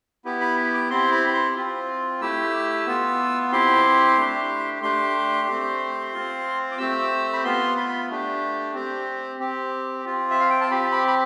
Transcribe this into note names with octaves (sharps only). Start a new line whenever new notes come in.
B3 E4 G4
B5
D6
C4 E4 G4 C6
B5
B5
C6
C4 F4
A3 E4 G4 E6
B3 F4
C4 E4 G4 C6
A3 D4 G4
A3 D4 G4 C6
A3 C4 G4
C4 F4
D6
A3 C4 G4 E6
B5
B3 F4 C6
B5
A3 D4 G4
C4 G4
C4 G4
C4 F4
E5
F5
G5
A5
C4 G4 B5
B5
B5